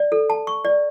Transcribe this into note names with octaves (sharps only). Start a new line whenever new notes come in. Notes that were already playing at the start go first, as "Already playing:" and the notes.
Already playing: D5
A4
A5
C#6
D5